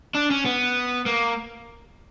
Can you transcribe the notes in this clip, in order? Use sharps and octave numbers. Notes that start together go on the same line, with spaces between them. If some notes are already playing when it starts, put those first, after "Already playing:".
D4
C#4
B3
A#3